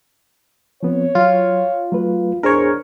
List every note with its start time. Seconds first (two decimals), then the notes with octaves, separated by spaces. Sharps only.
0.83 F3 B3 C4 C#5
1.15 F#3 F4
1.92 F#3 A3 B4
2.43 E2 D4 G#4 A#4 C5 C#5